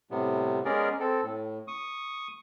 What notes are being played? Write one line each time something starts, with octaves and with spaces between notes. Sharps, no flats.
A2 C3 G3 B3
G#3 B3 C#4 G#4 A#4 D5
C4 A4
A2
C#6 D#6